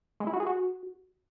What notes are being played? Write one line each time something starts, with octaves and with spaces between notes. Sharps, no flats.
G#3
E4
F#4
G#4
F#4